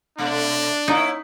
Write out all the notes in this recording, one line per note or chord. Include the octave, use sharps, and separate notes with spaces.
B2 A3 D4
A#3 C#4 D#4 E4